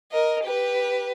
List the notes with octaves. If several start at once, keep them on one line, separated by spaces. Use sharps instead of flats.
A#4 D#5
G4 B4